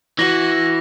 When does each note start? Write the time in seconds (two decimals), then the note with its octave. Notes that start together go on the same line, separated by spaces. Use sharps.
0.19 E3 F#4 A#6